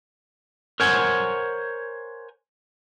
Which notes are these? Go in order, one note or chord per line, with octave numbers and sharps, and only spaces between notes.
A#4 C5 C#5 F#5 G#5